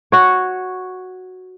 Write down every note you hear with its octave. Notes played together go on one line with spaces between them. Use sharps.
F#4 C#5